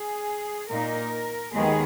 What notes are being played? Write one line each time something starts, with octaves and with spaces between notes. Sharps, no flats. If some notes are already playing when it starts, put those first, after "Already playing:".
Already playing: G#4
A#2 A#3 D#4 A#4
D#2 D#3 G#3 B3 G#4